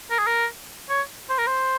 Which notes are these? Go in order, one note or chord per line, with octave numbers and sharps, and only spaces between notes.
A#4
G#4
A#4
C#5
C5
A#4
C5